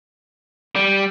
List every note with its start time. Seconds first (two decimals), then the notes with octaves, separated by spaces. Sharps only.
0.76 G3